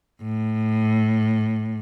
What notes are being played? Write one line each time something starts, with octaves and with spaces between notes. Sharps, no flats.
A2